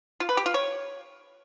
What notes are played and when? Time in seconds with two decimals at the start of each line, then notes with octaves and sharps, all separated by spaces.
0.20 F4
0.29 B4
0.37 G4
0.46 F4
0.54 C#5